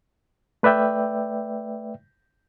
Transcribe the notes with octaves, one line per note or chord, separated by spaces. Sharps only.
A3 B4 D5 E5 G5